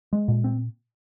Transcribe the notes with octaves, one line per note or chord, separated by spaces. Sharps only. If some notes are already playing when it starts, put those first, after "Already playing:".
G#3
A#2
C4